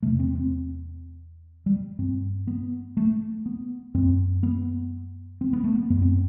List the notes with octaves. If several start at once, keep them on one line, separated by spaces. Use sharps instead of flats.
E2 C3 A3
C4
C4
G3
G2 C4
B3
A3
B3
F#2 C4
B3
C4
B3
A3
B3
F#2 B3
C4